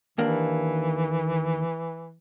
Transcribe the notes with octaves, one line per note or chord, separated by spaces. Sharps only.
D#2 E3 A#3 D4